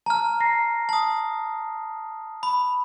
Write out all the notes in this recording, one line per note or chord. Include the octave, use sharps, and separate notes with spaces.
A5 A#5 F6
A#5 A#6 C7
A5 D#6
B5